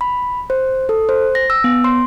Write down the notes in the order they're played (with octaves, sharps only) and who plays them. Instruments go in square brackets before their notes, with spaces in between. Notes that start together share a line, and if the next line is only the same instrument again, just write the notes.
[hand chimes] B5
C5
A4
C5
A#6
E6
B3
C6